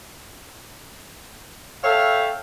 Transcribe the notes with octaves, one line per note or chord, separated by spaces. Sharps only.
A4 C#5 E5 F5 G5